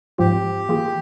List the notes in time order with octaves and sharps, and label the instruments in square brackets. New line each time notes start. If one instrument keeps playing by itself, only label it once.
[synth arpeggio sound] G#2 F3 C4 F4 [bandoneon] G4
[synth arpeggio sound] E3 A#3 F4 G#4